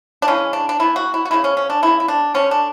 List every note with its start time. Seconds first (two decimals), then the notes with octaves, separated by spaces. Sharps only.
0.22 D4
0.28 C#3 E3 G#3 C#4
0.53 D4
0.69 D4
0.80 E3 B3 E4
0.96 F#4
1.14 E4
1.25 F#4
1.31 C#3 E3 G#3 B3 E4
1.44 C#4
1.57 C#4
1.70 D4
1.82 C#3 G#3 B3 E4
2.00 E4
2.08 D4
2.34 D3 A3 C#4
2.51 D4